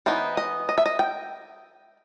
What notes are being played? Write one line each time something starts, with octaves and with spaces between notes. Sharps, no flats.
E3 B3 D#4 C5
D#5
D#5
E5
D#5
G5